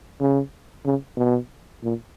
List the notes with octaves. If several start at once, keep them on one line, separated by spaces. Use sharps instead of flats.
C#3
C#3
B2
A#2